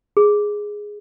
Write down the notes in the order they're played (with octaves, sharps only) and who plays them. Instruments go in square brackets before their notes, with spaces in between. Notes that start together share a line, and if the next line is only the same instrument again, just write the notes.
[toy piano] G#4